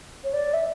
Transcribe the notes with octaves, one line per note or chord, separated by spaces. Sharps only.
C#5
D5
E5